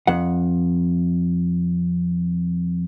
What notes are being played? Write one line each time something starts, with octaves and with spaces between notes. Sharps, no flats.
F2 F#5